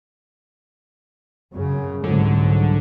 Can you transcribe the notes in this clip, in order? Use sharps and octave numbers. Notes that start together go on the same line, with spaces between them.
F#2 C#3
C2 G#2 D3 F#3